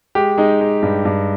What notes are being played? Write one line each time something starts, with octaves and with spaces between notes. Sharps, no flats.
G#3 G4
G#3 D#4
G#3
G2
G2